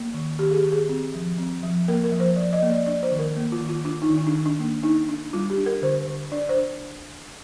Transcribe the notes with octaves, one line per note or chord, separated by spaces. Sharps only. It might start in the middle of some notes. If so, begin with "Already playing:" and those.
Already playing: A#3
D#3
D#3 G4
G#4
G4
D#3
G#4
C4
F3
C4
F3
A#3 A#4
A#4
F3
C5
F3 D5
D#5
A#3
D5
D4 D5
C5
D#3
A#4
A#3
F4
D#3
F4
D4 F4
D#4
D#3
D#4
D4
D#3
D4
A#3
D4 D#4
D4
G3 F4
G4
D4
A#4
D3 C5
D3
D4 D5
C5
D4